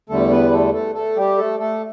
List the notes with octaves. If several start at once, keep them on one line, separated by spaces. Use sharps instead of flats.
E2 D3 G3 A3 A4
B3 B4
A3 A4
A3 A4
A3 A4
G3 G4
A3 A4
A3 A4